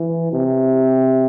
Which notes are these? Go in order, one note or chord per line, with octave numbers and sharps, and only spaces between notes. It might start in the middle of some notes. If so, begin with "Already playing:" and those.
Already playing: E3
C3